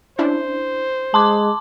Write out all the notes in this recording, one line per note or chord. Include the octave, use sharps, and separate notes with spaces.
C#4 D4 E4 C5
G#3 A5 C6 D6